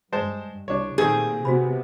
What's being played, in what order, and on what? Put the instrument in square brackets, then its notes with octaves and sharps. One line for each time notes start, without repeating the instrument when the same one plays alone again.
[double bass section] G2 [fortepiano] G#3 C5 A5
[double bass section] C2 [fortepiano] D4 C#5 [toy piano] D5
[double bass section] A#2 [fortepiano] D#3 A3 C4 [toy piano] G4 B4 G5 [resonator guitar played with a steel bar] G#4
[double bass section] C3 B3 [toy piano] F#4 C5 B5